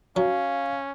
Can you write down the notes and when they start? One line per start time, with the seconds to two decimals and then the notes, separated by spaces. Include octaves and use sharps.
0.16 F#3 C#4 F5